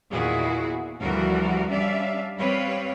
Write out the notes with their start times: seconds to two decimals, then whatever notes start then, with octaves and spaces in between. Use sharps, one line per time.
0.12 E2 A#2 D#3 E4 F#4 G#4
1.01 D2 E3 F3 G3 F#4 A#4
1.70 G3 C#4 D4 D5 E5 F5
2.38 G3 C4 B4 C#5 F5